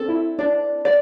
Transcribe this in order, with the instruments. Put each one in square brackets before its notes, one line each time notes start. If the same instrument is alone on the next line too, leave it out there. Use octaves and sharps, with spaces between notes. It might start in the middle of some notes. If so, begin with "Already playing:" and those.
Already playing: [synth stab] C4 D4 [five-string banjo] A4
[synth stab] E4
[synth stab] D4 [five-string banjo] D5
[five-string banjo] D5